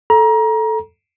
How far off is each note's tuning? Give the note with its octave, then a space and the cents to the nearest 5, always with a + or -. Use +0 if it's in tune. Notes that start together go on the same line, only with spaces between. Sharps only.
A4 -5 A#5 +25